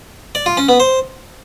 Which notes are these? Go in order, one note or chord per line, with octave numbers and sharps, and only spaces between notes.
D5
F4
C#4
B3
C5